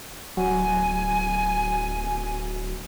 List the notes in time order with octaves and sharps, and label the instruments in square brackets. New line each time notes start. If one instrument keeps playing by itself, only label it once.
[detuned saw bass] D1 [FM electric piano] F#3 F#4 [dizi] G#5